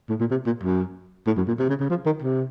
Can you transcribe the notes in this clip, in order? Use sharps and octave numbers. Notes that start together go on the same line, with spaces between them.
A2
A#2
C3
A#2
F#2
A2
F#2
A#2
C3
C#3
C#3
F3
D#3
C3